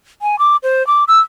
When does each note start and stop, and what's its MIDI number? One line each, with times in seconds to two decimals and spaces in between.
0.22 0.39 80
0.39 0.56 86
0.63 0.85 72
0.87 1.04 86
1.08 1.19 88